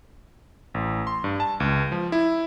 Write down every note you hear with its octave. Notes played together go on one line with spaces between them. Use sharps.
A1
C6
G2
A5
C#2
F3
E4